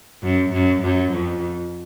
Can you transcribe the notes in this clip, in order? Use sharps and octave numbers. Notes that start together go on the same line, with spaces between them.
F#2
F#2
F#2
F2